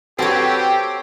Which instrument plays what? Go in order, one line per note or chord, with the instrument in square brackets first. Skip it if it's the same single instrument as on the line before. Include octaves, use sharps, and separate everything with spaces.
[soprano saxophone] C4 [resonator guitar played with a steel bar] F#4 B4 [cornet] G4 [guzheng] A4 C#5